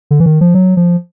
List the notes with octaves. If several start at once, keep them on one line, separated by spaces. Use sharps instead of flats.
D3
E3
D#3
F3
F#3
F3